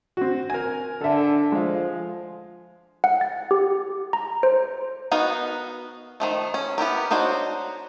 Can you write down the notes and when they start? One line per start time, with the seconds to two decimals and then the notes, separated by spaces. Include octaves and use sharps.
0.17 C4 F#4
0.50 A#4 G#5
1.01 D3 A4 E5
1.52 F3 G#3 F5
3.04 F#5
3.21 A6
3.51 G4
4.13 A#5
4.43 C5
5.12 B3 D#4 F#4 A#4 F5
6.20 D#3 F3 A3
6.54 C#4
6.78 B3 E4 G4 A#4
7.11 D4 D#4 F#4 C5 C#5